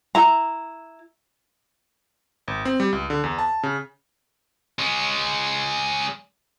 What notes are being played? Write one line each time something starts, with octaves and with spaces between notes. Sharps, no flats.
E4 A#5
G#1
C4
G3
C#2
D3
E2
A5
C#3
G#3 C#4